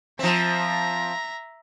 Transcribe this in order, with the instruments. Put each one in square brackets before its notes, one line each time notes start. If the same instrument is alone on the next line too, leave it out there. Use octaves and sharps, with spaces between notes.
[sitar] F3 C4 [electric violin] E5 A#5